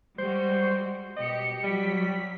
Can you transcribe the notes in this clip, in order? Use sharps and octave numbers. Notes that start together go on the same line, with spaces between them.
G3 G#3 F#4 C5
B2 G4 D#5 C#7
F#3 G3 B6